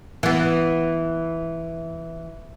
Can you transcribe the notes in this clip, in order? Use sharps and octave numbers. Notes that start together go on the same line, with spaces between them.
E3 B3